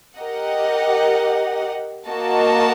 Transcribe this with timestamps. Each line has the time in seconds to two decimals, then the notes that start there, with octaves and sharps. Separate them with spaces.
0.17 G4 A#4 D#5 F#5
2.07 A#3 F#4 A#4 D#5 A5